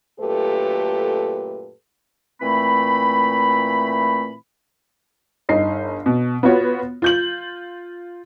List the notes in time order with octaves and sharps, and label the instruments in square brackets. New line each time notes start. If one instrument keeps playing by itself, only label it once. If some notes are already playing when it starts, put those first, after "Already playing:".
[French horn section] F#2 A#2 A3 G4 A4 B4
[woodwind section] A#2 E3 A3 C4 B5
[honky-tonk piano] G1 D#4 C7
B2
B3 F4 F#4 C#5
F4 G6 F#7